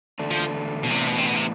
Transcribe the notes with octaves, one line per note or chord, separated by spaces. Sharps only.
E2 D3 A3 D4
F3
B2
A2 C3 E3 B3 D4
B2
C3
B2
C3